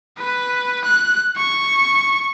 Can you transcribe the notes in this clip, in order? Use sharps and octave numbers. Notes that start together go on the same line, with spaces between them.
B4
F#6
C#6